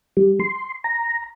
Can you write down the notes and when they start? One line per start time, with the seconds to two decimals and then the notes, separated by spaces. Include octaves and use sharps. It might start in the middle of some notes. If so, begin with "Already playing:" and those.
0.17 G3
0.40 C6
0.84 A#5